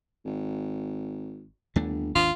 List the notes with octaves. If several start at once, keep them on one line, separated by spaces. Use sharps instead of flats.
G#1
G1 D#2 A3 D4
G#1 D#2 D4 F4